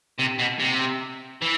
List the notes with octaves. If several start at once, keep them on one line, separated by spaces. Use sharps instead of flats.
C3
B2
C3
E3